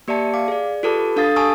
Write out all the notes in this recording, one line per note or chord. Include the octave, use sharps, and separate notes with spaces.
A#3 G4 D5 E5 A5 C#7
F5 D6
G#4 D5
F4 G4 A4 B4 A5 D6
D4 A4 F5 D#6 A6 C7
G4 G#5 A5 C#6 D#6 E6